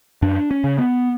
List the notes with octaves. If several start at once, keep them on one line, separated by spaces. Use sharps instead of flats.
F#2 D4
C#4
C#3
B3